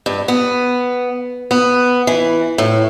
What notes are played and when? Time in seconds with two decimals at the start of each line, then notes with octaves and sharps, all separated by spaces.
0.06 G2
0.28 B3
1.51 B3
2.07 E3
2.58 A2